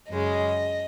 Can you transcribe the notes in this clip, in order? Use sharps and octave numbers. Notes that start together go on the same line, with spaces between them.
F#2 C#3 G#3 D#5